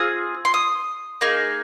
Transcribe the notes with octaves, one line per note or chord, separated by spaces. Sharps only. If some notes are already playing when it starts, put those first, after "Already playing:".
Already playing: C4 F4 G#4 D#6
C6
D#6
A#3 D#4 G#4